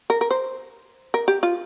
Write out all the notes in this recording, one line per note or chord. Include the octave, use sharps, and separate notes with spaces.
A#4
A#4
C5
A#4
G4
F4